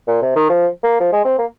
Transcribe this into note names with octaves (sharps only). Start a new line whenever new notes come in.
A#2
C3
D#3
F3
A#3
F3
G#3
C4
A#3